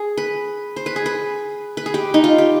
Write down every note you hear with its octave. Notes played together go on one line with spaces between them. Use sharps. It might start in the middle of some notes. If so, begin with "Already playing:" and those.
Already playing: G#4
B4
C5
B4
G#4
B4
B4
G#4
G4
D#4
F4
G4